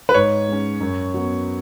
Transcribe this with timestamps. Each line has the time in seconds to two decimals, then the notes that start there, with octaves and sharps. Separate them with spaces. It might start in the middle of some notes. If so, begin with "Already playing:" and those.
0.09 B4
0.14 G#2 C#5
0.48 G#3 C#4
0.80 F#2
1.14 F#3 B3